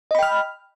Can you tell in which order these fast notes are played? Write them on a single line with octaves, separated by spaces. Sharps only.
D#5 B5 G5 F6